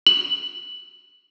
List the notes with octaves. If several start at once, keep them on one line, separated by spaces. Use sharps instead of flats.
F#7